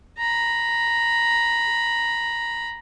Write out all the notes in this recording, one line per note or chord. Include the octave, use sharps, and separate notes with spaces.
A#5 B5